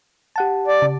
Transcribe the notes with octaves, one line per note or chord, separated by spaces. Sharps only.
G4 F#5 A5
D5
C#3